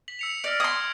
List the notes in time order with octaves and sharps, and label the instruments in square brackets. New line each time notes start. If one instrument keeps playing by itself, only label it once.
[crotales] B6 F#7
E6 C#7 F7
[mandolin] D5 [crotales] F6 A#6 D7
[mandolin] C6 D#6 [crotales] G#6 C7